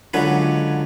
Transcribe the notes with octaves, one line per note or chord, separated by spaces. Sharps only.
C#2 D3 F#3 B4